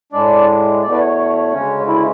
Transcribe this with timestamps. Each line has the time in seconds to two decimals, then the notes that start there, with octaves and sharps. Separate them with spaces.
0.12 A2 G#3 D4 D5
0.82 E2 B2 A3 D5
0.92 B4
1.00 C#5
1.52 D2 C#3 G#3 C#4
1.87 E4